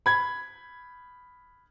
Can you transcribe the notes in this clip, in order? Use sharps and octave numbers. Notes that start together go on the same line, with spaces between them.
B5 G#6